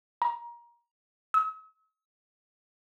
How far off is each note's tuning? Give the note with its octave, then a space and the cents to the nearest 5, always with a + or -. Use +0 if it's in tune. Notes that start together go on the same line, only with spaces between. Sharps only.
A#5 +25
E6 -45